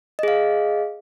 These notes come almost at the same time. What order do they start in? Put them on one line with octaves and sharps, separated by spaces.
D#5 G#4 F5